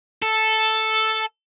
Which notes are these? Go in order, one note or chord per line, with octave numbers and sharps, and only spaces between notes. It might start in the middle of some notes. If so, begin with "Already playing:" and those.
A4